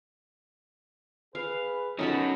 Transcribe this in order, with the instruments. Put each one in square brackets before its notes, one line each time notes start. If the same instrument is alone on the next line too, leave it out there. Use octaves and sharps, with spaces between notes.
[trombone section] G#4 B4 [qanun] F5
[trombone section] B2 [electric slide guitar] F#3 C#4 F#4 [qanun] D#4 A4 B5